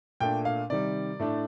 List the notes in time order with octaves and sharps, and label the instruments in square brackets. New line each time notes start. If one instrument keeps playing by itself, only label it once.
[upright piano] A#2 A3 D4 G5
F5
C3 D#3 G3 D5
A2 A3 D4